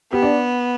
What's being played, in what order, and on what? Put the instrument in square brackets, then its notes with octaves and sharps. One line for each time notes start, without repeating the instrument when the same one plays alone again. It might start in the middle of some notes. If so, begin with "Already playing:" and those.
[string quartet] B3 [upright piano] G4
[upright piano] D4